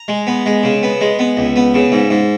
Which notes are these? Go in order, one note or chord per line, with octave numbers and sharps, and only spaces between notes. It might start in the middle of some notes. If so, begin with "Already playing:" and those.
Already playing: A#5
G#3
B3
G#3
C#3
B3
G#3
B3
C#2
B3
C#3
G#2
G#2